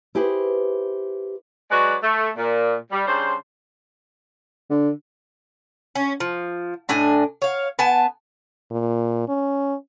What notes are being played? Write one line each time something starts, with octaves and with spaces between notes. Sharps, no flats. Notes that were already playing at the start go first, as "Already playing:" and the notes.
E4 G4 G#4 B4 C5
F#3 G#3 F#4 B4 C#5 D5
A3
A#2
G3
C#3 G3 D4 C5
D3
C#4
F3
A2 D4 D#5 G#5
C#5 F5
B3 G#5 A5
A#2
C#4